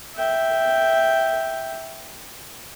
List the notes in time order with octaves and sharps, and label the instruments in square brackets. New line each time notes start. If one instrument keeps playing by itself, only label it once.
[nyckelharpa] E5 G5